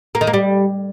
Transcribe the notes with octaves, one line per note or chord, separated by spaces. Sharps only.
A#3
D#3
A#3
G3